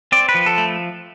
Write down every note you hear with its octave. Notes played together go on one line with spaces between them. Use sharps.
C4 D5
B4
F3
A4
A3